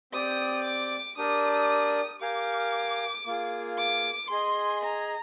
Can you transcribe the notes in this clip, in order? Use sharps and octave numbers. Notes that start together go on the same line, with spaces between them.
C4 G4 D5 G5 D#6
D6
D4 G4 A#4 D5 D#6
G4 A#4 F5 G#5 D6
A#3 F4 G#4
D6
G#4 D#5 G#5 C6
A#5